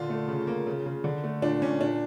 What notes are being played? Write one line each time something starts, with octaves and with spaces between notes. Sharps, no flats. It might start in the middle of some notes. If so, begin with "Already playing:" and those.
Already playing: A#2 D3 F4
A3
C#3
A#3
C#3
C#3
D3
A3
A#2 D4
A#2 C#4
A#2 D4